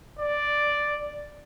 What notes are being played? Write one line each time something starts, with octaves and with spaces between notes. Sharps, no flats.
D5